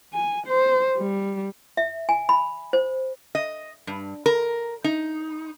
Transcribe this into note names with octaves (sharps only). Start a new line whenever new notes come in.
G#5
C5
G3
E5
G#5
B5
C5
D#5
G2
A#4
D#4